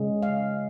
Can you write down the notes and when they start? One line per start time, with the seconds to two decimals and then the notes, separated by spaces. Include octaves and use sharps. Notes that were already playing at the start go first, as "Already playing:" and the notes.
Already playing: C#3 G#3
0.23 F5